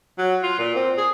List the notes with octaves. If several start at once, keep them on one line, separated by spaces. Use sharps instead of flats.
F#3
F4
A#2
C4
G#4